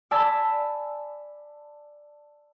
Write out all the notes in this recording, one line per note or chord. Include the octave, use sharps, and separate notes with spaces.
D5 G#5 A5 B5 E6